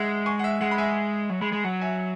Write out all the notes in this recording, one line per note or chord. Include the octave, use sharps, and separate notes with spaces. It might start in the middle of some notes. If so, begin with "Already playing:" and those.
Already playing: G#3 E5 F#5
G#5 C#6
F#5
E5
G#3 F#5
B5
E5 G#5
F#3
G#3 B5
G#3 G#5
F#3 F#5
E5 G#5